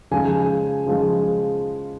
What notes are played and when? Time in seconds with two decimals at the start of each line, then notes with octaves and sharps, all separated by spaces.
0.11 C#3 F3 G#3 G#5
0.86 C#3 F3 G#3